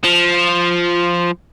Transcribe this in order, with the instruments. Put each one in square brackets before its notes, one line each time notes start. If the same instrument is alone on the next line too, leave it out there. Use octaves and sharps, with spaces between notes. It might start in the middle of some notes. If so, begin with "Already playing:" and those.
[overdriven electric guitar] F3